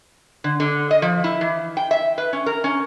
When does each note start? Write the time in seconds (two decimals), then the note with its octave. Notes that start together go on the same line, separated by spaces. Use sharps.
0.44 D3
0.60 D3
0.91 D#5
1.02 F3
1.24 E4
1.41 E3
1.77 G5
1.91 E5
2.18 B4
2.33 C#4
2.46 A#4
2.64 C#4